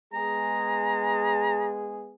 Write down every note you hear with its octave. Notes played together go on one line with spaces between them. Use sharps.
G#3 B3 G#4 A#5